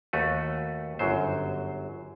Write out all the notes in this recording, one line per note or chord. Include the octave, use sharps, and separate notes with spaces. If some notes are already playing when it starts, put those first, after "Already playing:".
D#2 A3 F#4 B4
G1 F#2 F#3 C5